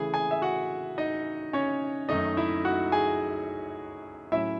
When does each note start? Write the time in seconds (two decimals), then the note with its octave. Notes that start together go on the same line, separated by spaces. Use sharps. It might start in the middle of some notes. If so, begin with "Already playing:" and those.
Already playing: C#3 E3 A3 E4 G#4 G#5
0.14 G#4 G#5
0.31 E5
0.42 F#4 F#5
0.98 D#4 D#5
1.53 C#4 C#5
2.09 F#2 D#3 A3 D#4 D#5
2.37 E4 E5
2.65 F#4 F#5
2.92 G#4 G#5
4.32 A2 F#3 C#4 E4 E5